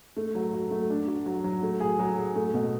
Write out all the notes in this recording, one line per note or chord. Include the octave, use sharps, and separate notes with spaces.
A3
F#3
F#3
A3
D4
F#4
F#3
F#3
A3
G#4
F#3
G#4
A3
B2